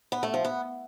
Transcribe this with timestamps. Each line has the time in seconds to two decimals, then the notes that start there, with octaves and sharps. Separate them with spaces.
0.12 B3
0.23 A3
0.34 F3
0.45 B3